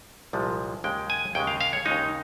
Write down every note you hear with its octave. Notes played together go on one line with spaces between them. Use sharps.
C2 A#2 F3 G#3
D#2 C#3 G#3 G5
G#5
D#2 C#3 G#3 G5
F5
F5
C#5
D#2 C#3 G#3 D#4